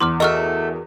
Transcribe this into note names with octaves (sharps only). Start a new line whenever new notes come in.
E2 C6 D6 F6
A3 F#4 G#4 A#4 D#5 E5 C#6 F6